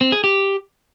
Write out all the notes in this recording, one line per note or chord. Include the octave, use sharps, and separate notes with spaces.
C4
G#4
G4